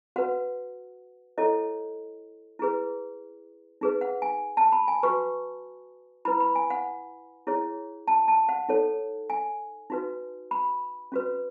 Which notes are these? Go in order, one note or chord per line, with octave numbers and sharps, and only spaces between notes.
F#4 B4 F#5
E4 A4 C#5 D#5
E4 G#4 B4
D#4 G#4 B4
F#5
G#5
A5
B5
G#5
F#4 B4 C#6
E4 B4 B5
B5
G#5
F#5
E4 G#4 C#5
A5
A5
F#5
D#4 A4 C#5
G#5
D#4 F#4 B4
B5
C#4 F#4 B4